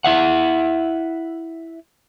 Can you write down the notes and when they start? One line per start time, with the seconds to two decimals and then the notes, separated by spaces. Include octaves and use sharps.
0.04 E4 E5 F#5